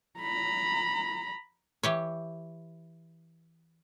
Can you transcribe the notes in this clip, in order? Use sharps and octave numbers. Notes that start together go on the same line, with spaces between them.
A#5 B5
E3 G4 C#5